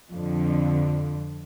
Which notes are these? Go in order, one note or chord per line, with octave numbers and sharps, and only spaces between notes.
F2 D3